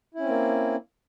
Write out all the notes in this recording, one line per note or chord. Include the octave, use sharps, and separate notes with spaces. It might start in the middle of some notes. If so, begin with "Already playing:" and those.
A#3 C4 C#4 E4